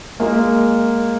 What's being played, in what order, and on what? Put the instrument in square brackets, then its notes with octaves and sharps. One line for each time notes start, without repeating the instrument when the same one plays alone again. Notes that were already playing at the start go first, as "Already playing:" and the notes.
[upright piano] G#3 A#3